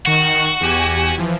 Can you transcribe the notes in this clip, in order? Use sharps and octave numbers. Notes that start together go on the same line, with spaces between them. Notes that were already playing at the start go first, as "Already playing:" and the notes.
D#3 F#4 C#6 E7
E2 G4 G#5
E3 F3